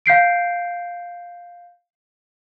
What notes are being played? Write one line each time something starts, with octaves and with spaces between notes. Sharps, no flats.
F5 G6 C7 D7